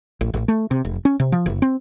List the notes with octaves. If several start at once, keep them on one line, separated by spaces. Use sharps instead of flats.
A1
A1
A3
C3
F1
C#4
C3
F3
F#1
C4